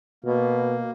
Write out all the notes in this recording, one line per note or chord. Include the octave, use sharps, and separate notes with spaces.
B2 A#3